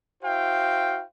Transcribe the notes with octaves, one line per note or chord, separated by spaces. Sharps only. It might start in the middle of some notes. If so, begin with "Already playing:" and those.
E4 F#4 C5 F5 G5